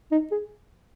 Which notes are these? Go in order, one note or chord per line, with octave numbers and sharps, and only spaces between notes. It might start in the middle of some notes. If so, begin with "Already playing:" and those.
D#4
G#4